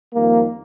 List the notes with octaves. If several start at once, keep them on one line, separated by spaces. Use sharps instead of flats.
F2 D#3 G3 A#3